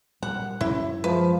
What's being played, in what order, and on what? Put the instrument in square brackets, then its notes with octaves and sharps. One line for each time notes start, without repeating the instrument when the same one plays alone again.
[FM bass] A#2 [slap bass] G3 A#3 [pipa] F#5
[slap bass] F#2 [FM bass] C#4 [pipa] E4
[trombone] F3 [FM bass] G#3 [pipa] B4